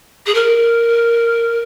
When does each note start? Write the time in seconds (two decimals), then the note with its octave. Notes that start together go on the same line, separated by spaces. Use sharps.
0.26 G#4
0.34 A#4